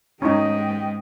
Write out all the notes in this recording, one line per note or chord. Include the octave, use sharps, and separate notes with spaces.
G#2 C#4 D#4 D#5 G5